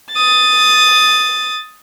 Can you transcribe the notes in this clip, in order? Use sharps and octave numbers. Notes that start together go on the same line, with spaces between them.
D#6 A6